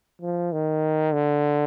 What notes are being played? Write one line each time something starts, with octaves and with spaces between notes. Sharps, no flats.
F3
D#3
D3